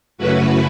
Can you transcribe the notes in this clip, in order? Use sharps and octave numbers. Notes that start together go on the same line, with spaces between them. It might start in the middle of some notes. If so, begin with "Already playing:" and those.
F#2 C#3 A3 C#4 E4 F#4 B4